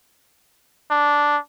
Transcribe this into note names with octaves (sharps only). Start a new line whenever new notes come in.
D4